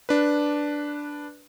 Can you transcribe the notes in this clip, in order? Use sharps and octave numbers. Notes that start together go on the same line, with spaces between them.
D4 B4